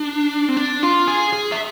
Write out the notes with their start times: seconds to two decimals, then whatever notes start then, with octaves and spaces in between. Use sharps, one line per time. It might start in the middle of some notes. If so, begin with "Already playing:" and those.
Already playing: D4
0.48 C4
0.57 D4
0.83 F4
1.07 G#4
1.33 G#4
1.52 E5